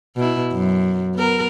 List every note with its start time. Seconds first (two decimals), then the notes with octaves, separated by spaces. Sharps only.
0.16 B2 E4
0.52 F#2
1.15 B3 A#4